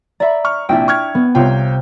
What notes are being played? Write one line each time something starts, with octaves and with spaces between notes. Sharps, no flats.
D5 E5 A#5 B5
C#6 F6
A#1 C3 D4 E4 G5
C#6 F6 G#6
B3
C2 C3 F4 C#5 G5